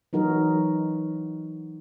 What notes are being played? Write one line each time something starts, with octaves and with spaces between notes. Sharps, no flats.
E3 F#3 D#4 F#4 A#4